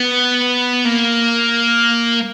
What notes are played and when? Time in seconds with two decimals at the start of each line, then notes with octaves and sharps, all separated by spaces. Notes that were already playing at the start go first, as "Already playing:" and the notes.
Already playing: B3
0.85 A#3